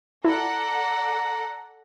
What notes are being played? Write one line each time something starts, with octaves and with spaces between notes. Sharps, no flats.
E4 A4 D5 F#5 A#5